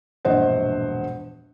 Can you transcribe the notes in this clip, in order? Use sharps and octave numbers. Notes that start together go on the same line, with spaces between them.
E1 A#1 G2 C5 D#5 F#5